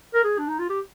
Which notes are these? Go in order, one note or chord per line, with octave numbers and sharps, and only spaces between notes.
A#4
G#4
D4
D#4
F4
G4